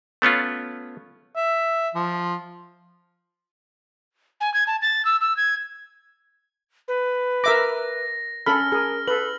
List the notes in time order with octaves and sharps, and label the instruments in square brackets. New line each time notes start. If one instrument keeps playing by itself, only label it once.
[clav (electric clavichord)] A3 B3 C#4 F4
[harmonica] E5
F3
[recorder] G#5
G#6
A5
A6
E6
E6
G#6
B4
[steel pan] A#4 E5 D6 [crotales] A#6
[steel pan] C#4 A4 B5 [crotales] F6
[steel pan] G#4 [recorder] A#4
[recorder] A4 [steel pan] B4 [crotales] F#7